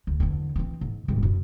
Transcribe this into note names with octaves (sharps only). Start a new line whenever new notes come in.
D2
E2 D3
E3 C4
G#2
D#1 G#1
F#2 B2